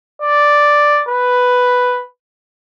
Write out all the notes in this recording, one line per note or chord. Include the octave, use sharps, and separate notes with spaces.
D5
B4